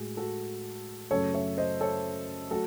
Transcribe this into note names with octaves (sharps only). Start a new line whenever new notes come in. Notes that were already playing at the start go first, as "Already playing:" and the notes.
Already playing: A2 G#3 F#4 G#4
F#4 A4
F#2 C#3 F#3 A3 A4 C#5
C#5 E5
C5 D#5
A4 C#5
F#3 A3 F#4 A4